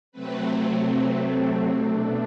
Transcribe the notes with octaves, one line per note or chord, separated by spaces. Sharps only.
C3 F#3 A3 C4 B4
B4
A4
B2 A3 D4 A4